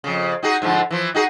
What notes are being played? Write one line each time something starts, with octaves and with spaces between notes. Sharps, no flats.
F2 C#3
D#4 F#4 G#4
G#2 D3 F3
E3 F3
D#4 F#4 G#4